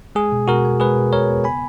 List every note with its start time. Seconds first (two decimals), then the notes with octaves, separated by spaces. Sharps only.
0.15 G#3 G#4
0.32 B2
0.48 B2 F#4 A#4
0.65 B3
0.80 G#3 G#4 B4
0.97 B2
1.13 B2 A#4 C#5
1.29 B3
1.44 C#3 G#5 B5